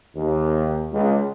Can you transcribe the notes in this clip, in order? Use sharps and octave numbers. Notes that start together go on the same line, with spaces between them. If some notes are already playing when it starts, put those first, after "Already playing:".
D#2
C#2